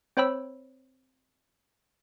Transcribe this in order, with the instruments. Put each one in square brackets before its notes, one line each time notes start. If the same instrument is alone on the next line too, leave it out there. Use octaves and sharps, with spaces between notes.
[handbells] C4 C5 C#5 G5 B5 E6